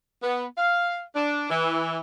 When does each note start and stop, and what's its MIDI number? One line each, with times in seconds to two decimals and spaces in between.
0.23 0.44 59
0.57 1.00 77
1.15 1.49 62
1.50 1.99 52